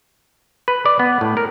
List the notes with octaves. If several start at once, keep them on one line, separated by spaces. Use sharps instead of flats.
B4
D5
B3
A2
A#4